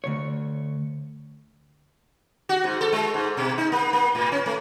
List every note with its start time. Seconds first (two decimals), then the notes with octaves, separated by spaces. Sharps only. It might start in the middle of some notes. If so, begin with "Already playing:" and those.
0.04 D2 B2 C#5
2.49 F#4
2.64 G#2
2.81 A4
2.93 G#3
3.14 G#2
3.37 B2
3.58 D#4
3.72 A#3
3.93 A#3
4.15 A2
4.32 C#4
4.46 A3